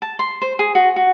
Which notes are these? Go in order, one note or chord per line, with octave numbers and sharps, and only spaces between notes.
A5
C6
C5
G#4
F#4
F#4